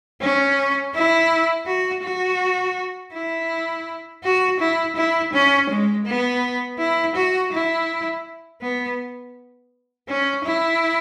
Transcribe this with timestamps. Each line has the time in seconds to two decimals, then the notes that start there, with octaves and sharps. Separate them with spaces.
0.21 C#4
0.94 E4
1.67 F#4
2.04 F#4
3.13 E4
4.24 F#4
4.60 E4
4.96 E4
5.33 C#4
5.70 G#3
6.06 B3
6.79 E4
7.15 F#4
7.53 E4
8.62 B3
10.08 C#4
10.44 E4